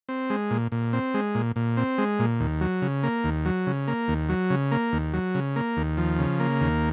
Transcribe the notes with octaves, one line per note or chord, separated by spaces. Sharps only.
C4
G#3
A#2
A#2
C4
G#3
A#2
A#2
C4
G#3
A#2
D#2
F#3
C#3
A#3
D#2
F#3
C#3
A#3
D#2
F#3
C#3
A#3
D#2
F#3
C#3
A#3
D#2
F3
C#3
A#3
D#2